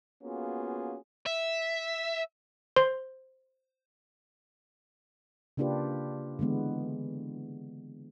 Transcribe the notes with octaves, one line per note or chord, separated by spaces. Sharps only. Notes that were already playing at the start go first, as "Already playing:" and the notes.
A#3 B3 C#4 F4 F#4 G#4
E5
C5 C6
C#3 A#3 D4 F4 G4 B4
D3 E3 G#3 B3